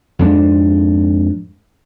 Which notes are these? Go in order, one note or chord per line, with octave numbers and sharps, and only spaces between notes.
F2 G#2 D4